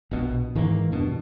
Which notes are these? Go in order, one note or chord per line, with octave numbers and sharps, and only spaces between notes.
A#1 B2
G#2 D#3 E3 A#3
E2 G2 B2 D4